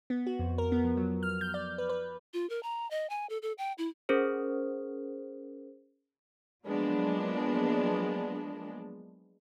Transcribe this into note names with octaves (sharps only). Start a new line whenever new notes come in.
B3
F#4
F2
A#4
B3
F3
F#3
F6
G6
D5
B4
B4
F4
A#4
A#5
D#5
G#5
A4
A4
G5
E4
C#4 G#4 A#4 C5
F3 F#3 G#3 A#3 B3 D4